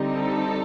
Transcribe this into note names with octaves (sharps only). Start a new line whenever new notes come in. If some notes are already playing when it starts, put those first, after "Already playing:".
Already playing: D3 G3 C4 D#4
A4